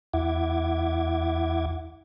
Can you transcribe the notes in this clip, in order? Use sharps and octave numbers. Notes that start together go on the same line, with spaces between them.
E2 E4 E5 F#5 D6 G#6